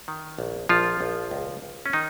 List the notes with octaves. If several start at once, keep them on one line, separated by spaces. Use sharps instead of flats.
D#3
A#1
A#1 F3 F4
A#1
C#2
C#2
C#4
D#3 D#4